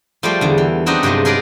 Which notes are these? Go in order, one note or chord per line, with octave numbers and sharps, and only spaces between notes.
F3 G3 A3 F4 C5 D5
E2 D3
E3
G3 C4 D4 D#4 F#4 B4
G2 C3 F3 F#3 G#3
D#4 G#4 A#4 B4 D5